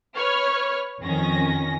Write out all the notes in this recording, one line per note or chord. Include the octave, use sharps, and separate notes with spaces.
B4 C#5 F6
F2 D#3 C#4 A#6